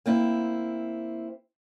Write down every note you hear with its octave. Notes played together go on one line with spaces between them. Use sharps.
A#3 C4 E4